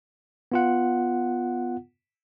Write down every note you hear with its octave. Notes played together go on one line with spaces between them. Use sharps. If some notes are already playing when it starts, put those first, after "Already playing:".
B3 F4 F#5